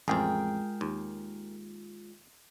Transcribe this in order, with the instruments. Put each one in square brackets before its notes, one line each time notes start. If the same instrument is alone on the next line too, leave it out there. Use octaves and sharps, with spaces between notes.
[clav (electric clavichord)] A1 F2 [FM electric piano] G#3 F4 [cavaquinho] G#4 A#4 G5
[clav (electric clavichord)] D#2